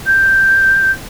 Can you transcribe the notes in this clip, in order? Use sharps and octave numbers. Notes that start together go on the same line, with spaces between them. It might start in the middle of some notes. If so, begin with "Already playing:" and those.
G6